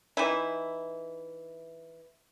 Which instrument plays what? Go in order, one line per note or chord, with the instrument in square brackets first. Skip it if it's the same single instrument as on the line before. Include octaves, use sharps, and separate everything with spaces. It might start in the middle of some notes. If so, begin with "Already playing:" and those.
[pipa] E3 D#4 E4